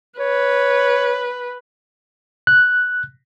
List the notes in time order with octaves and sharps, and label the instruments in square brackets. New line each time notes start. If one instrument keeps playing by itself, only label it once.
[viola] B4 [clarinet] C#5
[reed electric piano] F#6